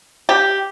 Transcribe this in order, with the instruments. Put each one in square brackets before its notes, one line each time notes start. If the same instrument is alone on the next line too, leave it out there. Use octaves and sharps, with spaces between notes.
[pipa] G4